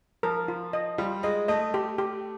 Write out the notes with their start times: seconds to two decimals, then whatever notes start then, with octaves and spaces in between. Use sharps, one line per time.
0.23 F3 A#4
0.48 F4
0.73 D#5
0.98 G3 F4
1.23 G#3 D#5
1.48 A3 D#5
1.74 G4
1.98 G4